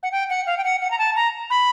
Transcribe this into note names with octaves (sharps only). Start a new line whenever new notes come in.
F#5
G5
F#5
F5
G5
F#5
F#5
A#5
A5
A#5
B5